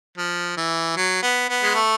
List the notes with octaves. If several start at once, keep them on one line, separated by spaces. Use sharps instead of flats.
F3
E3
F#3
B3
B3
G#3
A3